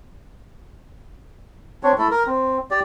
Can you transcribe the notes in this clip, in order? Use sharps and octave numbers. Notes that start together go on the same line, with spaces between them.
C4 D4 C#5
A3 E4 A4
A#4
C4
G4 D5